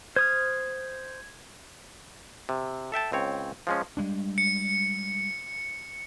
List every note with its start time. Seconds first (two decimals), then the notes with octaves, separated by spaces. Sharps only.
0.16 C5 D#6 F6 G#6
2.49 C3
2.92 A4 E5 G5 A5
3.12 C#2 C4 C#5
3.67 F3 G#3 C#4
3.97 G3 G#3 D4
4.38 C#7